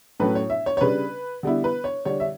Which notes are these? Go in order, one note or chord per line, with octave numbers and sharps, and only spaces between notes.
A2 F#3 A3 C#4 B4
C#5
E5
C#5
C#5
C#3 G3 D4 B4
D3 G3 B3 E4
B4
C#5
D3 G3 D4 C#5
E5